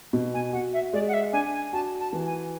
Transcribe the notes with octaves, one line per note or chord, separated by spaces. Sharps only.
B2
G#5
F#4 F#5
E5
G#3 D5
F#5
E5
D4 G#5
G#5
F#4 A5
A5
E3
G#5